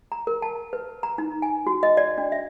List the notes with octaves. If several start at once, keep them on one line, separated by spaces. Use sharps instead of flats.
A#5
A#4
A5
B4
A#5
D#4
G#5
F#4
D#5
D5
D4
E5